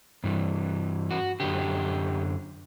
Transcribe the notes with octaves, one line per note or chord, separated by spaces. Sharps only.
G2 E3
F#4
F#2 D3 G4